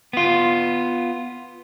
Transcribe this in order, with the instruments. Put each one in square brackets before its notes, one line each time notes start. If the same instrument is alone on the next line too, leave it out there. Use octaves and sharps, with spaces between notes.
[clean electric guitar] B3 F4